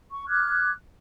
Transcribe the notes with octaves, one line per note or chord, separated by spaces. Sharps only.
C#6
D6 F6 F#6 G#6